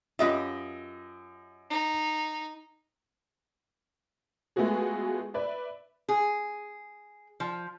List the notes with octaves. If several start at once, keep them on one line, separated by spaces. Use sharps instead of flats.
F#2 F4 G4 B4 D#5 E5
D#4
G#3 A3 B3 F4 F#4 G#4
B4 D5 E5
G#4
F3